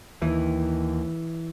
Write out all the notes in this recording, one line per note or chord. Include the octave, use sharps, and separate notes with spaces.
D#2 E3